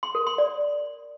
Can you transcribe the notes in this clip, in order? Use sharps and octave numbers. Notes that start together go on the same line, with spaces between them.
C6
A#4
C6
D5